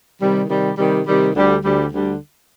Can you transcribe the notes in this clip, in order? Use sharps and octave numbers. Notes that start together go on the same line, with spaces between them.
C3 D#3 G3
C3 D#3 G3
C3 D#3 G3
C3 D#3 G3
D2 D3 G3
D2 D3 G3
D2 D3 G3